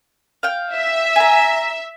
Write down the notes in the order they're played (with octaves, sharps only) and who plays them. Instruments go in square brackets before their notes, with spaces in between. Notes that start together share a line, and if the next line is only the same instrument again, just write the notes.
[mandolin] F5 G5
[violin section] E5
[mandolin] G#5 A#5